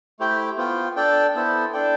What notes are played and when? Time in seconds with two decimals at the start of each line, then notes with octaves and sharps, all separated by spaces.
0.19 A3 E4 G4 C5 G5
0.57 B3 F4 C5 G5
0.96 D4 A4 D5 G5
1.35 B3 E4 A4 C5
1.73 D4 A4 D5 G5